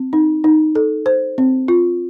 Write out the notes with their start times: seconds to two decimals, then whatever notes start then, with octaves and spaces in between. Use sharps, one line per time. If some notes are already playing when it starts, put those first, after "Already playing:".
Already playing: C4
0.13 D#4
0.44 D#4
0.75 A4
1.06 C5
1.38 C4
1.68 F4